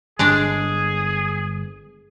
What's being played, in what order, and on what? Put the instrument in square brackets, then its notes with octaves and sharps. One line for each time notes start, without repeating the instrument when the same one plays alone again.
[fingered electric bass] G1 [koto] G#3 D4 D5 [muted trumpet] G#4